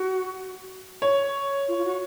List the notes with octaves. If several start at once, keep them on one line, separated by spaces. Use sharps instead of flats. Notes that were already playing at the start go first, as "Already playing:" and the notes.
Already playing: F#4
C#5
F4
F4
F#4